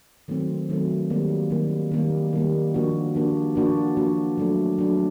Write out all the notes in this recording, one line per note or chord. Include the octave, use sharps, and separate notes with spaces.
D#3 F#3 A3 C4
D#3 F#3 A3 C4
D#3 G3 A#3
D#3 G3 A#3
D#3 G3 A#3
D#3 G3 A#3
F3 A#3 D4 F#4
F3 A#3 D4 F#4
F3 A#3 D4 F#4
F3 A#3 D4 F#4
F#3 A3 D4
F#3 A3 D4